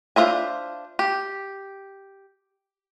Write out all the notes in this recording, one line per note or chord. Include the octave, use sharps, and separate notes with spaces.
D4 F4 C5 E5 G#5
G4